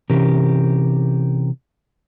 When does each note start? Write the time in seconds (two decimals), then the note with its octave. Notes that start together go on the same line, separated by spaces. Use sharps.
0.10 C3 E3 C#4 G4 A#4